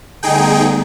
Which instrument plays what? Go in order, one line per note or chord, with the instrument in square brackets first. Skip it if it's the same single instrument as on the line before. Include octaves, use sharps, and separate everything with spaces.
[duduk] D3 [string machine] G3 A3 B3 [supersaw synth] D#4 G#4 G5